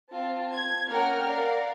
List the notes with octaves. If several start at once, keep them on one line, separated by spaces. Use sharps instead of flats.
C4 F4 A5
G#6
A#3 C#4 A#4 F#5 G5 F6
A#4 D5 F5 F#5